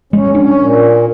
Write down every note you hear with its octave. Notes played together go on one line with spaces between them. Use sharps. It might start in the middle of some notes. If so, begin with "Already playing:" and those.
G#3 C#4
C#4 D4
A#2